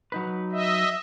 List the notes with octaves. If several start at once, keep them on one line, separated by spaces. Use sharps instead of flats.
F#3 D#4 B4
D#5 E5